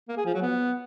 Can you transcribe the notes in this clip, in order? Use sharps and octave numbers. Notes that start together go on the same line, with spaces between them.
A#3
G#4
F3
F#3
B3